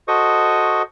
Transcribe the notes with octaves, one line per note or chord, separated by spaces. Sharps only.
F#4 A4 C5 D#5 C#6 D#6